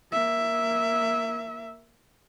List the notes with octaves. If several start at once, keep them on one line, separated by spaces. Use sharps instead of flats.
A#3 E5